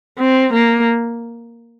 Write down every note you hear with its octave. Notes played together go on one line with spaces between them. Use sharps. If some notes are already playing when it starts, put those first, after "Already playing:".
C4
A#3